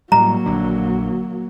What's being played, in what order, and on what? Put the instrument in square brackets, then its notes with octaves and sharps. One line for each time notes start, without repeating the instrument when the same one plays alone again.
[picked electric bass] A2 G3 [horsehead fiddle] F#3 A#3 [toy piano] A#5
[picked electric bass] A#1 D3